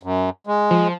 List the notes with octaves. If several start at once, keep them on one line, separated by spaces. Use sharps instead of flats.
F#2
G#3
F3